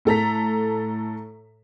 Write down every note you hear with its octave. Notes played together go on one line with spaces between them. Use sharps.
A2 A4 A#5 B6